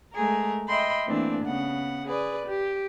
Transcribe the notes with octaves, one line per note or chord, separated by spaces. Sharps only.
G#3 A3 G#4 A#4
D#5 E5 G5 B5 C6
E3 A3 A#3 C4 D4
C#3 B3 F#5
G#4 B4 D5
G4